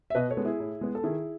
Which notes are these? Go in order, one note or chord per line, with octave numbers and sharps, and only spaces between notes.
E5
B2 B4 D#5
A4 C#5
G#3 B3
E4 G#4
A2
G#3 B3
A4
D#3 E4 G#4